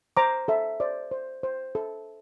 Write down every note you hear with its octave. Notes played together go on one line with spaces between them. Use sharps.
C5 A#5 D6
A4 E5
C5 D5
C5
C5
A4